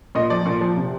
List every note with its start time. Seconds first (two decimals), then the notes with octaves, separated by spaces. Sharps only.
0.15 A#2 D#5
0.30 F3 D5
0.46 A#2
0.61 F3
0.77 C3